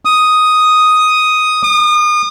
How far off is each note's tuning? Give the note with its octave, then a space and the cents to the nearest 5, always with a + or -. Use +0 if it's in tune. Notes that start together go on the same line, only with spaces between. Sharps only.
D#6 +5
D#6 -35